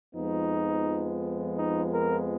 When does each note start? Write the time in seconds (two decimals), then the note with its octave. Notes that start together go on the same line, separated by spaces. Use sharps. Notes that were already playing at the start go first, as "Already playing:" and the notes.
0.14 F2 F3 G#3 B3 D#4
1.57 D#4
1.92 A#4